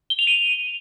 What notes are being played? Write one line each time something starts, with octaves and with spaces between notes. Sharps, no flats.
G7
F7
D#7